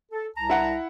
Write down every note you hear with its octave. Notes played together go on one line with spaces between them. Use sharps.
A4
C2 A5 A#5
E4 F#5